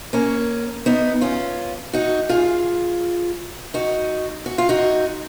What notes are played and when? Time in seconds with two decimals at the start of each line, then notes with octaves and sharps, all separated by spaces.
0.13 A#3 C#4
0.86 B3 D#4
1.21 C#4 F4
1.93 D#4 F#4
2.29 F4 G#4
3.74 D#4 F#4
4.46 F#4
4.58 F4
4.69 D#4 F#4